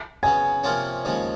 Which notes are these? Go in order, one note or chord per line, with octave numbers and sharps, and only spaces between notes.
C#3 F#3 B3 G#5
C3 F3 A#3 C#4 F4
D#2 C#3 F3 G#3